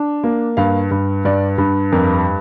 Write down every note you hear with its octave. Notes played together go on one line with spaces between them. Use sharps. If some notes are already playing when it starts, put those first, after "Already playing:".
Already playing: D4
A#3
G2 F5
G2
G2 D5
G2
F2 A#4